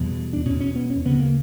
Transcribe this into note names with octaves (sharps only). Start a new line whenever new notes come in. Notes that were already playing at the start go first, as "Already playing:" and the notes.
Already playing: E2 B2 G3
D4
E2 B2 C#4
C#4
B3
C#4
D2 C#3 B3
A#3